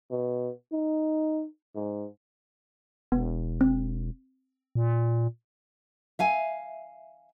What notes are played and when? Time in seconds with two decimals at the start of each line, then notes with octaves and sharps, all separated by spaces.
0.11 B2
0.72 D#4
1.75 G#2
3.12 E1 B3
3.61 C4
4.75 A#2
6.19 E5 F5 G#5